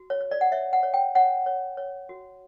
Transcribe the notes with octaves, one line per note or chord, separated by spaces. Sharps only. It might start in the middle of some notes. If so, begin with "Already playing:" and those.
Already playing: F#4
C#5
C#5
D5
F#5
C#5 E5
F#5
C#5
G5
C#5 F#5
C#5
C#5
F#4